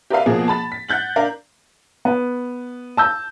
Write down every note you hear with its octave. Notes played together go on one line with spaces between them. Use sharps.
G4 A#4 B4 D5 E5 F5
B2 F3 A#3 G#4
A5 B5 A6
B6
F#5 F#6 G6 A6 F#7
D4 A#4 F5
B3
A5 E6 G6